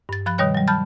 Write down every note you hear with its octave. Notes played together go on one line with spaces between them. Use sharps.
G2 A6
F3 B5 F#6 A6
B2 D#3 G3 C#5 F#6
F#3 G3
A5 B5 F6 G6 A6